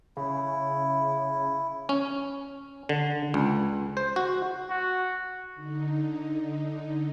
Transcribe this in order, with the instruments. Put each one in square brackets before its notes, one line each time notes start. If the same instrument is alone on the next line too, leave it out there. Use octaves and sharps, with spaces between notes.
[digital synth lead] C#3 [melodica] E4
[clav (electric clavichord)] C#4
D3
C#2
C5
F#4
[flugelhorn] F#4
[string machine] D3 D#4